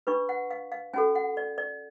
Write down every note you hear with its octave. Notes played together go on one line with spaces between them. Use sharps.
D4 F4 B4 C#6
F#5
F5
F5
C#4 F#4 A4 G#5
F#5
D5
D5